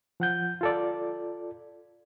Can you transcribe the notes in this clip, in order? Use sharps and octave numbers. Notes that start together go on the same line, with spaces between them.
F3 F#5 G6
F4 A4 D5